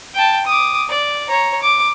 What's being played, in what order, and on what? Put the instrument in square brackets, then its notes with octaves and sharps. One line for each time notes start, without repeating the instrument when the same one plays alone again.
[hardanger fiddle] G5 A5
D6 D#6
D5
C#5 A#5
D6